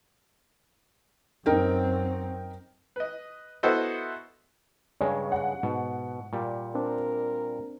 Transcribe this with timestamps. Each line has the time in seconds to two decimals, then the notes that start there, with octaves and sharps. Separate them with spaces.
1.46 F#2 C4 D#4 A#4 G5
2.96 B4 D#5
3.63 B3 E4 F#4 A4 C5 D#5
5.01 G2 C#3 G#3 C#5
5.32 F#5
5.63 G#2 B2
6.33 A#2 G3
6.75 C4 D4 A#4